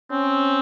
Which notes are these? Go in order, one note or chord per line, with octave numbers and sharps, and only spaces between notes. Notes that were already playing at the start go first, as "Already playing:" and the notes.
C4 C#4